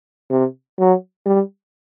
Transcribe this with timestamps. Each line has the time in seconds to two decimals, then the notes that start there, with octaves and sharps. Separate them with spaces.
0.30 C3
0.79 F#3
1.26 G3